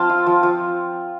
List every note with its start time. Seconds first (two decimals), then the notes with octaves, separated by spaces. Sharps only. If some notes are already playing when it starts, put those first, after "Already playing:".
Already playing: F3 C4 F5 G5 A5
0.09 F4
0.26 F3
0.43 F3